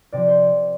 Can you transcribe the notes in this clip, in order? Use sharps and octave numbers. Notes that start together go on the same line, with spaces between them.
C3 F3 D5
C5